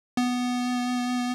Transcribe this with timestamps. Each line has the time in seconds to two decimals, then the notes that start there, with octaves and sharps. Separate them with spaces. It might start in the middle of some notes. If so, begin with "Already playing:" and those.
0.17 B3